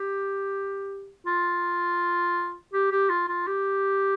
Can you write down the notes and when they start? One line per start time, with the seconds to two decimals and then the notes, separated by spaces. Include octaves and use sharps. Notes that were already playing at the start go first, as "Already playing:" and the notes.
Already playing: G4
1.26 F4
2.73 G4
2.92 G4
3.10 F4
3.28 F4
3.47 G4